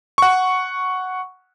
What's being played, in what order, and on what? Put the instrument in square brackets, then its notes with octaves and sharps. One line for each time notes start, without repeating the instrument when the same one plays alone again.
[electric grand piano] F#5 C#6